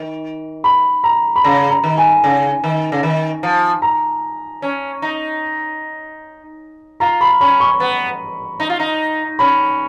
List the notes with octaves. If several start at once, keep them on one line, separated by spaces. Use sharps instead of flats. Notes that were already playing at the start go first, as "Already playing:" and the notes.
Already playing: D#3
B5
A#5
B5
C#3 A#5
A#5
D#3
G#5
C#3
D#3
C#3
D#3
F3
A#5
C#4
D#4
F4 A#5
B5
C#4 B5
C#6
B3
D#4
F4
D#4
C#4 B5